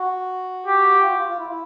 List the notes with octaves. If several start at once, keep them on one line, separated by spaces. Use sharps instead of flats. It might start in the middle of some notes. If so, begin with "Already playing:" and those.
Already playing: F#4
G4
F4
F#4
F4
F4
E4
E4